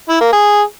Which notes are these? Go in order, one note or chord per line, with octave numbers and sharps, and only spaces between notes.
E4
A#3
G#4